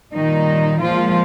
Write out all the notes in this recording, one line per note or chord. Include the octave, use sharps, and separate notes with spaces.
A#2 D#3 G3 D#4
A#2 F3 G#3 F4